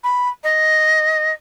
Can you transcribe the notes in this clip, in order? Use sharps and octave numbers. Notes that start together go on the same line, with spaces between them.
B5
D#5